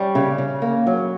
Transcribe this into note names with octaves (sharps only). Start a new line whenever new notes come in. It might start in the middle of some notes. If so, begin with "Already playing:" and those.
Already playing: G3 C#4
C#3
C#3
A#3
F#3